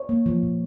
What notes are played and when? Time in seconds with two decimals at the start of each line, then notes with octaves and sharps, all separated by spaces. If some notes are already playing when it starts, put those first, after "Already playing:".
Already playing: C#5
0.09 A#3
0.26 F3
0.43 A#2